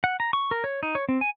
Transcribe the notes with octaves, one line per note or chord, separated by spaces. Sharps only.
F#5
A#5
C#6
A#4
C#5
D#4
C#5
C4
G#5